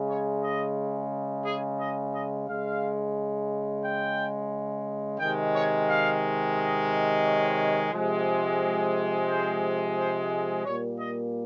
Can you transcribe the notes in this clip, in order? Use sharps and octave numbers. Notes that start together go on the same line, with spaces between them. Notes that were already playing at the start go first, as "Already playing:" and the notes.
Already playing: C#3 G#3
C#5
D#5
G#4
D#5
D#5
C#3 G#3 F5
G5
C3 D#3 G#3 G5
C#5
F5
D#5
C#5
C3 F3 G#3
C5
C5
D#5
A#2 G3 A#3 C#5
D#5